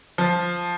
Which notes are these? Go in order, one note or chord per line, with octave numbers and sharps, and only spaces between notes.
F3